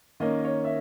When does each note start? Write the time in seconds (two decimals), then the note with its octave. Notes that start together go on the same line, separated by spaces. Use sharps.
0.20 D#3 A#3 C#4 D#5
0.45 C#5
0.65 E5